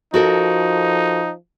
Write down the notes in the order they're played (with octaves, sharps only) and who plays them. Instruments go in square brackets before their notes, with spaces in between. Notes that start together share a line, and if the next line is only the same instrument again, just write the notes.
[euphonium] F3 [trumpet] D#4 [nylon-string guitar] F#4 A4 A#4